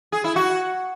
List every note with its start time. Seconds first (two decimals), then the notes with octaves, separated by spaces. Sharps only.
0.12 G#4
0.24 E4
0.36 F#4